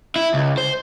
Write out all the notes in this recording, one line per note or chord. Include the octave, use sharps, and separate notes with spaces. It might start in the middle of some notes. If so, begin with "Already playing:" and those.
E4
C#2
C5